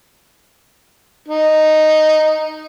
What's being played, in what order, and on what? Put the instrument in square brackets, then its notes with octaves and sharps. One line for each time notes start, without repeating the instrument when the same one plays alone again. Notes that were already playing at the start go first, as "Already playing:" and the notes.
[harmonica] D#4